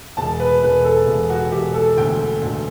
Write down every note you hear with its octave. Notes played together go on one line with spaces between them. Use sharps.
E1 A5
B4
E1 B4
A4
E1
F#4
E1 G4
A4
D2 G5
D2